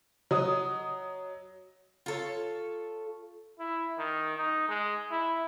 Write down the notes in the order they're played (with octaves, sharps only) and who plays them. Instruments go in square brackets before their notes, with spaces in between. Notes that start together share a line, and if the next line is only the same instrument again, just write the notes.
[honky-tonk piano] F#3 D#5 D#6
[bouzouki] F4 A4 C#5
[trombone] E4
D#3
D#4
G#3
E4